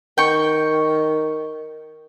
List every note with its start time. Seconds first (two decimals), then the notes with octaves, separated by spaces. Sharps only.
0.18 D#3 G5 C#6